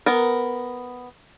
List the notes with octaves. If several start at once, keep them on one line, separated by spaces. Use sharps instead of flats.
B3 A#4